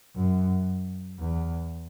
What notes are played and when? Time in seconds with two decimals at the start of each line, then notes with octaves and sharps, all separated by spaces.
0.16 F#2
1.19 E2